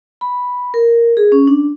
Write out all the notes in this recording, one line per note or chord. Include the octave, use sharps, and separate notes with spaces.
B5
A#4
G#4
C#4
D4